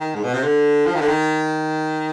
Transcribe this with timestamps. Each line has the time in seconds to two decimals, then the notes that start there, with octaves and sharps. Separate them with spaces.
0.01 D#3
0.15 G#2
0.24 B2
0.34 C3
0.44 D3
0.86 F3
0.95 D#3
1.01 D3
1.08 D#3